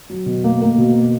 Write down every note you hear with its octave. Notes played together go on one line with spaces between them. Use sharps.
F#3
B2
A#3
A#3
B2